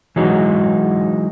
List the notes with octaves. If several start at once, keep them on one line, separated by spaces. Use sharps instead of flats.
E3 F#3 G#3 D#4 F#4